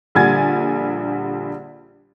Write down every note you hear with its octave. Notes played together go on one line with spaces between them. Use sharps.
A#1 D3 G3 G#5 G#6 A6